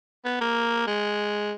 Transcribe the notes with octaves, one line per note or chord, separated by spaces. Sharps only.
B3
A#3
G#3